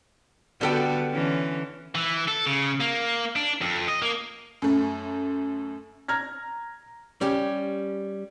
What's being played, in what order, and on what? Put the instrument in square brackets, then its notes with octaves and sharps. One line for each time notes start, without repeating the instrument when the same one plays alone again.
[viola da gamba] D3 B3 F#4 [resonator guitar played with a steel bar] G3 A4 G5
[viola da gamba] D3 E3 C#4
[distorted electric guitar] E3
A4
C#3
A#3
D4
F2
D#5
A#3
[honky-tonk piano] F#2 A3
[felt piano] A#5 F6 G#6 A#6
[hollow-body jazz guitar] G3 C#4 G4